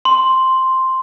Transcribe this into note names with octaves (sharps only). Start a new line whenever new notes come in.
C6